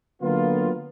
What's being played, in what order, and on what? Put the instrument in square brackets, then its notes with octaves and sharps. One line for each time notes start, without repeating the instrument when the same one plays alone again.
[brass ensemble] D3 F#3 A#3 B3 F4